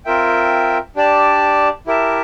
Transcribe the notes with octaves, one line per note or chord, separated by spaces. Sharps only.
C4 F4 A#4 E5 G5
D4 G4 D5 A5
E4 G4 A#4 E5 A5